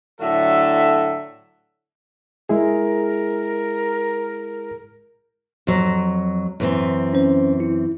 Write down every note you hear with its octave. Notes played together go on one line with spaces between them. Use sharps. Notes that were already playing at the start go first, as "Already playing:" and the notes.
A2 D3 F#3 F#4 A4 E5
G#3 E4 G#4 A#4
F2 F#3
F#2 E3 C4
C#4 C5
E4